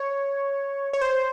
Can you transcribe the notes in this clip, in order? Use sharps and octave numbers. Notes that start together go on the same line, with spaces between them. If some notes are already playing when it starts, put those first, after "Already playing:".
Already playing: C#5
C#5
C5